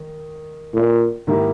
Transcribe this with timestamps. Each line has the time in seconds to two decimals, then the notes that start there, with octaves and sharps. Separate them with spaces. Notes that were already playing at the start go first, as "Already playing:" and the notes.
Already playing: D#3
0.74 A#2
1.27 G#2 D#3 A#3 E4 G4